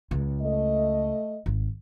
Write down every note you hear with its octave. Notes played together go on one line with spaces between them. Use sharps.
C#2
A3 D#5
G#1